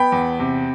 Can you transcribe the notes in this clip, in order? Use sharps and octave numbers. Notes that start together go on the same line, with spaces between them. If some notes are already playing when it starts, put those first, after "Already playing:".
Already playing: B3 G5 B5
E2
C3